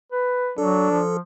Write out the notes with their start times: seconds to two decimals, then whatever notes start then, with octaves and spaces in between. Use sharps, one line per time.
0.12 B4
0.58 F#3 D4 A4
0.90 F3